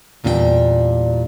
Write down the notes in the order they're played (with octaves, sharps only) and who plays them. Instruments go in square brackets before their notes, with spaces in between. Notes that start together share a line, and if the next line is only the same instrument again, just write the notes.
[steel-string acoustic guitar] E2 A#2 G3 D4 E4 G5